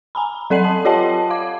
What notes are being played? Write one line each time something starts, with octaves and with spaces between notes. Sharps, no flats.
G#5 A#5 B5
F#3 A4 D5 F#5 C7 F#7
A5
F4 G4 C#5 D#5 F#5 A5
F5 D6